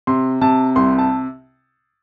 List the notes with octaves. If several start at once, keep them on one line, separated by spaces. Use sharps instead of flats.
C3 C6
C3 A5
C2 C6
A5